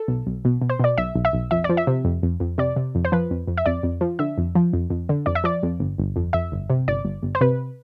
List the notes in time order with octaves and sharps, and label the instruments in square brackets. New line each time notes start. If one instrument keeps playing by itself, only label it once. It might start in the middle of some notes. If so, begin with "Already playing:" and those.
Already playing: [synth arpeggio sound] A4
B1
B1
B2
B2
C5
B2 D5
B1 E5
B1
E5
B1
F2 E5
D5
F3
E5
C3
F2
F2
F2
C3 D5
C3
F2
C5
F3 B4
F2
F2
E5
F2 D5
F2
F3
D3 E5
F2
F3
F2
F2
D3
F2 D5
E5
F3 D5
F2
G1
G1
F2
F2 E5
G1
C3
G1 D5
G1
G1
C5
C3 B4